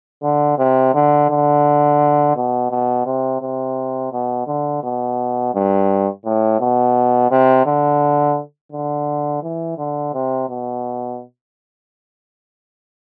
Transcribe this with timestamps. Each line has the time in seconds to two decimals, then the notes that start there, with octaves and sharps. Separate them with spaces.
0.23 D3
0.58 C3
0.94 D3
1.30 D3
2.36 B2
2.71 B2
3.06 C3
3.41 C3
4.12 B2
4.47 D3
4.83 B2
5.54 G2
6.25 A2
6.60 B2
7.31 C3
7.66 D3
8.72 D3
9.43 E3
9.78 D3
10.14 C3
10.49 B2